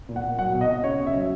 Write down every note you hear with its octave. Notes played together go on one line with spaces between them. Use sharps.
A#2
F#5
A#2
F#3 F#5
B2
D#5
B2
C#3 C#5
C#3
E5
F#3